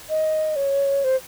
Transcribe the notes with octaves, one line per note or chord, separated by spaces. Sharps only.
D#5
C#5
C5